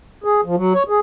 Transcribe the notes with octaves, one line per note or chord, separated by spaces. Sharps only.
G#4
F3
F#3
C#5
G#4